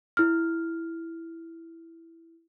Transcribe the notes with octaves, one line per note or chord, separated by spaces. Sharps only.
E4 F6